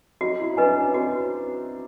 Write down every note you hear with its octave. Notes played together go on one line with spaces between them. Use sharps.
D#4 F#4
E4
D#4
D4 B4 D#5 G#5
C#4
C4 F#4